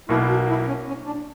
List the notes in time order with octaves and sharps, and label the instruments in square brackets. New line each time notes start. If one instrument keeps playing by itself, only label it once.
[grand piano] B1 B2 A#3 [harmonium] E4
[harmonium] F#4
E4
C#4
C#4
D4